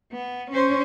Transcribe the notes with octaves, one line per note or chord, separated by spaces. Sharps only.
B3
C#4 C5